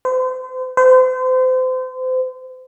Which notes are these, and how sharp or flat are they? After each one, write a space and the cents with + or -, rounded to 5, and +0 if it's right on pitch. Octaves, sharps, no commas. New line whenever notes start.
C5 -40
C5 -35